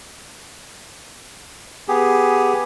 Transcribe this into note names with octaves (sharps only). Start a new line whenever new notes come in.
B3 G4 G#4